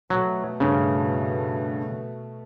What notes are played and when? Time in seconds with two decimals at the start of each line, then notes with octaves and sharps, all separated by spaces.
0.10 B2 F#3 A3
0.60 G2 C#3